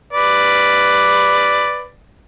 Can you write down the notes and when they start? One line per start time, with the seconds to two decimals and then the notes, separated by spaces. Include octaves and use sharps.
0.13 B4 D5